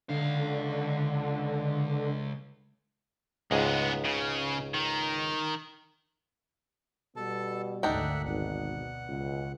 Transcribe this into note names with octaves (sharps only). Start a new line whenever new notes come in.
C#2 D3 F5
C#2 G#2 G#3 B3
C#3
D#3
B2 G3 B3 A4 A5
G#1 D2 D3 D4 D#4 E5 F#5 G5
G#1 B2 F#5
C#2